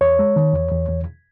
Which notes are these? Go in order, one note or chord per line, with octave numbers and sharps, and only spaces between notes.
E2 C#5
G#3
D#3
E2
E2
E2